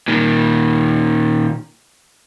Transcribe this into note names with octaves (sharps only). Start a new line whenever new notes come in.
A#2 D#3